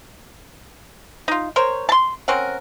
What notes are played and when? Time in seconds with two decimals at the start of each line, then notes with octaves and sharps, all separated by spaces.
1.28 D#4 F4
1.56 A#4 C5 C#5
1.89 A5 C6
2.28 C4 C#4 A#4 F#5